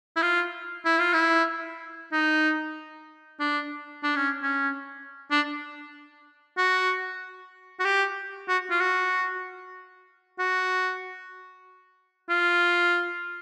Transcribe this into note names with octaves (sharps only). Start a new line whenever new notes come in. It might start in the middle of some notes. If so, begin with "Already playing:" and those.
E4
F4
E4
F4
E4
D#4
D4
D4
C#4
C#4
D4
F#4
F#4
G4
F#4
F4
F#4
F#4
F4